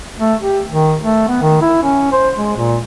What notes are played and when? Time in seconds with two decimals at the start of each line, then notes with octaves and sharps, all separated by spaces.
0.19 A3
0.40 G4
0.69 D#3
1.02 A3
1.28 B3
1.41 D#3
1.62 E4
1.83 C#4
2.12 C5
2.36 G#3
2.57 A#2